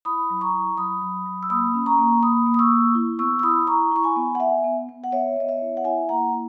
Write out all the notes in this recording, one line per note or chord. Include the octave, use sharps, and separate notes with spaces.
E4 B5 D#6
F#3
A#5 C#6
E4
F#3 B5 D#6
F#3
F#3
E6
A#3 B5 D#6
C#4
A#5 C#6
A#3
A#3 B5 D#6
A#3
D#6
C#6 E6
A#3
E4
B3 C#6 E6
E6
E4 B5 D#6
E4 A#5 C#6
E4 C#6
G#5 B5
B3
F#5
B3 E5 G#5
B3
B3
F#5
B3 C#5 E5
B3 D#5
C#5 E5
E4
F#5
E4 E5 G#5
A#3 F#5 A#5
E4